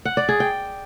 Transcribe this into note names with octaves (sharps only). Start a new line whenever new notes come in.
F#5
D5
G#4
G5